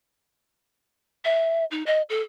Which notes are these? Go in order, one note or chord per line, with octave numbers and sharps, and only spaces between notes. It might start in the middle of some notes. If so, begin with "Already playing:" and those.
E5
D#4
D#5
A4